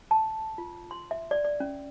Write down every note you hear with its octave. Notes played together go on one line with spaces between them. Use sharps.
A5
F4
C6
E5
D5
D5
C#4